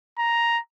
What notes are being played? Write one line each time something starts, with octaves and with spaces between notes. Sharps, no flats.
A#5